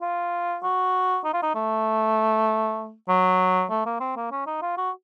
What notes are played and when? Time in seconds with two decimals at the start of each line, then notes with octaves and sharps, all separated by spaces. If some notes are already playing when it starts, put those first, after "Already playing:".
0.01 F4
0.63 F#4
1.24 D#4
1.33 F4
1.43 D#4
1.55 A3
3.09 F#3
3.70 A3
3.85 A#3
4.00 C4
4.16 A#3
4.31 C#4
4.47 D#4
4.62 F4
4.77 F#4